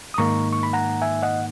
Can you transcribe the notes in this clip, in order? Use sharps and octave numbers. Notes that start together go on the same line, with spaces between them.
D#6
G#2 D#3 A#3 D#4 A#5 C#6
C#6
B5
F#5 A#5
E5 G#5
D#5 F#5